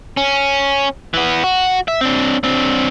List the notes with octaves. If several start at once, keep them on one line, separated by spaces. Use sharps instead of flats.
C#4
E3 B3
F#4
E5
C4 D4
C4 D4